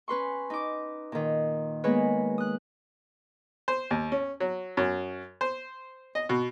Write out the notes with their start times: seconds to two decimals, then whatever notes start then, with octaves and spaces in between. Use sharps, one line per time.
0.08 C#4 B4 C6 C#6
0.50 D#4 D6
1.12 A#2 D#3
1.84 G#3 A#3 B3 B4 C#5
2.38 D#6 F#6
3.68 C5
3.91 D#2
4.12 C#4
4.40 F#3
4.77 F#2
5.41 C5
6.15 D#5
6.29 B2